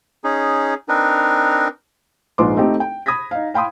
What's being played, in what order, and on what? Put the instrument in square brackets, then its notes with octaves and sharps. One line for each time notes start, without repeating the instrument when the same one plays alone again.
[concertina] C#4 D#4 G#4
C4 D4 D#4 A#4 B4
[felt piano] A#1 G#2 D#4 B4 C6 D6
A3 C4 D#4 G4
G5
B5 D#6 G#6 A#6 B6
D#4 F5
F5 G5 B5 C6 D#6